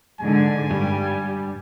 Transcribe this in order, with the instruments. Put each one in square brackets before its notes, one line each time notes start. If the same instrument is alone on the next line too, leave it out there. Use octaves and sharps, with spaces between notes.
[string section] G#2 D3 [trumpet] G#5
[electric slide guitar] G2 [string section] G3